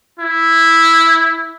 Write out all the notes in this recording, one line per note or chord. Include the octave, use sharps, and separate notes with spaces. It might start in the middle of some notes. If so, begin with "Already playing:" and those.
E4